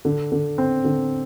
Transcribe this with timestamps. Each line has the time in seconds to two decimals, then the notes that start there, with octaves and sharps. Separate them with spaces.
0.05 D3
0.32 D3
0.58 C4
0.85 D3